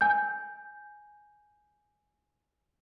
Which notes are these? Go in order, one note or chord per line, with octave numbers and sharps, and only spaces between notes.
G#5 G6